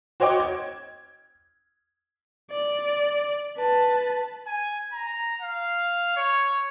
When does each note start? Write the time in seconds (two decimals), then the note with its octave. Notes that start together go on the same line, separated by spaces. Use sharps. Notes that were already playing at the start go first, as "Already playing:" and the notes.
0.20 F#4 C5 C#5 D#5 G5 D6
0.40 G#6
2.51 D5
3.57 B4 A5
4.47 G#5
4.93 A#5
5.41 F5
6.17 C#5